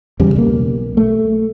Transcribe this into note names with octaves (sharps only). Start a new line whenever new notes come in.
E2 C#3 G3
B1 A#3
A3